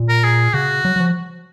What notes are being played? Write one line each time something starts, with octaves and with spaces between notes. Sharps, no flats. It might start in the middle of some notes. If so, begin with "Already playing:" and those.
Already playing: A#2
A#4
G#4
C#3 F#4
F#3
F#3
F3